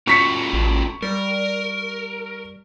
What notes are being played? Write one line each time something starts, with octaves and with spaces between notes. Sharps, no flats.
C#4 F4 F#4 C#6 B6 C#7
A1
G3 A#4